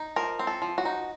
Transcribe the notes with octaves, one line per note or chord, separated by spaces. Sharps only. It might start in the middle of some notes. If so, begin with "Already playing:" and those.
Already playing: D#4
F3 A#4
C4
A4
F3
F#4
D#4